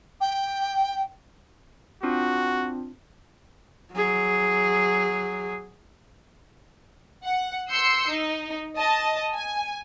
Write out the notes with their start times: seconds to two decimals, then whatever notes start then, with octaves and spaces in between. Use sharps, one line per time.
0.21 G5
2.03 C4 D4 F4 F#4
3.93 F#3 G#4
7.24 F#5
7.70 C6 E6 G6 C7 C#7
8.08 D#4
8.77 D#5 A5
9.34 G#5